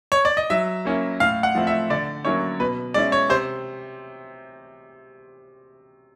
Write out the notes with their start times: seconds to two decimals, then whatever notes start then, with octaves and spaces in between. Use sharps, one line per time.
0.12 C#5
0.25 D5
0.37 D#5
0.50 F#3 E5
0.85 A#3 C#4 E4
1.20 A2 F5
1.43 F#5
1.55 F3 A3 C4 E4
1.67 E5
1.90 D3 D5
2.25 F#3 A#3 C#4 E4 C#5
2.60 B2 B4
2.94 G#3 C#4 E4 D5
3.12 C#5
3.29 C3 C5